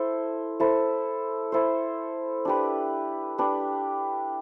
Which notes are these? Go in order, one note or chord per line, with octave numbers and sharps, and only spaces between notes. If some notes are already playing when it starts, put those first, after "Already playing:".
Already playing: E4 A4 C5
E4 A4 C5
E4 A4 C5
D4 G4 B4
D4 G4 B4